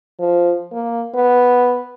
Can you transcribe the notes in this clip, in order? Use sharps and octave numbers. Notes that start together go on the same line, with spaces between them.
F3
A#3
B3